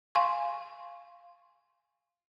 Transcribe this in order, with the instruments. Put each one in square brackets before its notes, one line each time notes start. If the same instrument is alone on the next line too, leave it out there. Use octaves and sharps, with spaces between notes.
[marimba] F5 G#5 C6 C#6